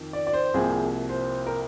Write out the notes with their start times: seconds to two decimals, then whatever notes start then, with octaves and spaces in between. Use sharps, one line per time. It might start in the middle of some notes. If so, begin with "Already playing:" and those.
Already playing: F2 D#3
0.13 D5
0.27 D5
0.33 C5
0.54 C2 C3 F3 A#3 G#4
1.09 C5
1.46 A#4